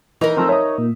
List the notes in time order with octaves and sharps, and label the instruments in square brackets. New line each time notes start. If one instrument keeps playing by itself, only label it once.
[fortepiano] E3 [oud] D#4 A#4
[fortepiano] F3 A3 C4 [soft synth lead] E6
[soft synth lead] C#5 [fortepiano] E5 D#6
[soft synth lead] A#2